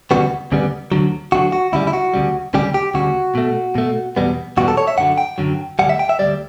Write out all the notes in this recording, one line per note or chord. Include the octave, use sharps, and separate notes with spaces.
D2 C#3 G3 B3 F#4
D2 C#3 G3 B3
D2 D3 F#3
D2 D3 F#3 F#4
F#4
D2 C#3 G3 E4
E4
F#4
D2 C#3 G3
D2 C#3 G3 G4
G4
D2 C#3 G3 F#4
B2 A3
B2 A3
E2 B2 G3 B3
E2 B2 G3 B3 F#4
A4
C#5
E5
F#2 D3 F#3 F#5
G5
F#2 D3 F#3
D2 C#3 G3 F#5
E5
G5
E5
D2 C#3 G3 D5